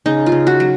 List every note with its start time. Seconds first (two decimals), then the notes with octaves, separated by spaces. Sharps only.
0.06 C#3 D#4
0.26 F4
0.32 C#3
0.47 F#4
0.60 F#3